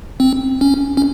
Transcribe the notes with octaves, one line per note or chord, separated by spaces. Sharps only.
C4
C#4
C#4